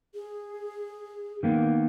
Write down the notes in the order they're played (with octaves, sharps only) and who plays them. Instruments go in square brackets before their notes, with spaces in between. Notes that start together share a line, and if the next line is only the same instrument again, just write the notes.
[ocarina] G#4
[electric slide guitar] D#3 A#3 B3